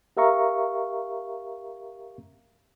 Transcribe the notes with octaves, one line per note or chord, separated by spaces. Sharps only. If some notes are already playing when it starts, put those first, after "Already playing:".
G4 A#4 E5 F5 A#5 C#6